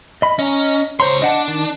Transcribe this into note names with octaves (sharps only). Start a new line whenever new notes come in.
D#5 B5
C#4 D#5 A#5
C#2 C5 C#5 A#5 C6
D4 D#5 F#5 A5
D#3 A5